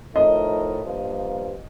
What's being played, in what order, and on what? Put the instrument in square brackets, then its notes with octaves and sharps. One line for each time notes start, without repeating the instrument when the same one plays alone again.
[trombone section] A2 F3 A3 D#4 A#4 [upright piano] D#5
[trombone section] G2 F3 A#3